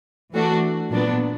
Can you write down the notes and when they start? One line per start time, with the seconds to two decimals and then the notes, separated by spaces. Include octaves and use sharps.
0.33 E3 A3 D4 F#4
0.91 A#2 F#3 B3 D4